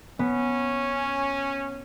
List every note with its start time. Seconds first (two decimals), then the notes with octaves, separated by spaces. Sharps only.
0.19 B3 C#4